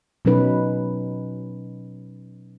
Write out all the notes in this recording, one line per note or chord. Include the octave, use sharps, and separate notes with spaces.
B2 F#3 C#4 D#4 B4